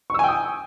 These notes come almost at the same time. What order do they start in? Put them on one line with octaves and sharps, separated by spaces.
C#6 E6 G#5 G5 D#6